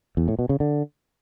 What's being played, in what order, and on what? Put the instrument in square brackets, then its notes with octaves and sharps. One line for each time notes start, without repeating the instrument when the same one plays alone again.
[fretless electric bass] E2
A2
B2
C#3
D3